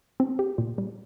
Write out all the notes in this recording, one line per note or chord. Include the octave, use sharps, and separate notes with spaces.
C4
G4
A#2
G3